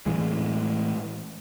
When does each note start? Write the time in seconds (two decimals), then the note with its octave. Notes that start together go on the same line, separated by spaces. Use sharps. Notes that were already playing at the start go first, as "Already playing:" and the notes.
0.06 A2 E3 G#3